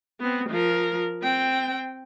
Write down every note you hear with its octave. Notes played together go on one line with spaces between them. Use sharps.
B3 C4
F3 A#4
C4 G5